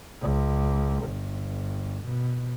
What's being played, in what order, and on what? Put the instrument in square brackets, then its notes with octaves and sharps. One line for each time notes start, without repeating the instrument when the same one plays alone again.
[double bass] C#2
G1
B2